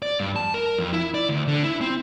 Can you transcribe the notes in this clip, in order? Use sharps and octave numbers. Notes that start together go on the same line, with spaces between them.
D5
G2
A5
A#4
F2
E4
D5
D2
D3
E4
C4